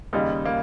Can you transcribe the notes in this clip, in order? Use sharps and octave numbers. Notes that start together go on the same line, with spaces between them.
D#2 C#3 G3 D#4
A#3